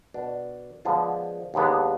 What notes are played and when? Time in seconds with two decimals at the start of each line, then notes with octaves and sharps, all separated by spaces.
0.14 B2 B3 D4
0.85 D3 F3 G#3 B3 F4
1.54 D#2 D3 G#3 B3 D4